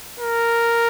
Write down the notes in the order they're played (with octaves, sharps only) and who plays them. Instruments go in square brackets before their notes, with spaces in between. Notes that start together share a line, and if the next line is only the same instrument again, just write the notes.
[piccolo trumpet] A#4